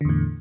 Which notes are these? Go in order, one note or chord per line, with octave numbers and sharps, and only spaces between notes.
E2 A2 D3